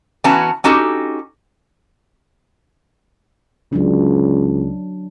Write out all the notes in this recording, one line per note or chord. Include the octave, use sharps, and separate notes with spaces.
E3 B3 C#4 F#4 A5 A#5
C#4 D#4 F#4 G4 A4
C#2 F#3 D4